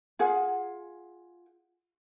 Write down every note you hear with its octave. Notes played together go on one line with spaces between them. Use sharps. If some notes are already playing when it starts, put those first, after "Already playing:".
F4 G#4 F#5